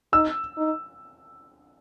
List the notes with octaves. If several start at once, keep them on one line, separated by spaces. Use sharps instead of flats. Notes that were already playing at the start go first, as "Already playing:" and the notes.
D#4 E6
D#4